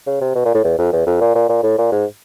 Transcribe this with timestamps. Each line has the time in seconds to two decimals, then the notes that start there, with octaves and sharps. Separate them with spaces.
0.07 C#3
0.21 C3
0.35 B2
0.45 A#2
0.55 A2
0.64 E2
0.78 F2
0.93 E2
1.07 F2
1.21 A#2
1.35 A#2
1.49 A#2
1.63 A2
1.78 A#2
1.92 G#2